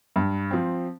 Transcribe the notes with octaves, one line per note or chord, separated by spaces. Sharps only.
G2
F3 C4